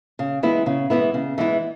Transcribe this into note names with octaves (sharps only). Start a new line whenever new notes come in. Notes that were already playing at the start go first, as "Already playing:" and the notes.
C#3
E3 G#3 B3 E4
C#3
E3 G#3 B3 E4
C#3
E3 G#3 B3 E4